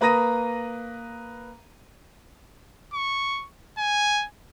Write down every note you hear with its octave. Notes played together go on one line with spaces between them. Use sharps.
A#3 B4 A#5 D#6 A#6 D#7
C#6
G#5